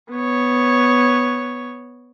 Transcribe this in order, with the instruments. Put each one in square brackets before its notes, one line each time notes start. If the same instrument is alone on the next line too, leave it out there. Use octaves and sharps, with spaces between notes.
[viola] B3 C#5